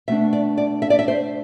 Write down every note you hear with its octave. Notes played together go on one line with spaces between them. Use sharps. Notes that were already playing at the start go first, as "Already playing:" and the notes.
B2 A3 D4 E5
D5
D5
E5
D5
E5
C5